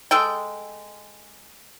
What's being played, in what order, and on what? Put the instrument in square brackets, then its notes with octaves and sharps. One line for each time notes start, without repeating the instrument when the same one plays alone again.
[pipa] G#3 A4 G5